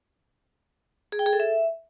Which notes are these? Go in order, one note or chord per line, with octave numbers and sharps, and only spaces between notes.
G#4
G5
G#4
A4
E5